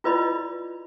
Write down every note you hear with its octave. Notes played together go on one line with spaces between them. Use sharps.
E4 F4 B4 D5 D#5 B5